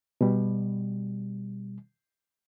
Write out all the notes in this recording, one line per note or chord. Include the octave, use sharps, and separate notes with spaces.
B2 G3